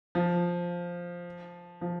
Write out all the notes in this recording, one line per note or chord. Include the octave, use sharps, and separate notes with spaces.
F3
F3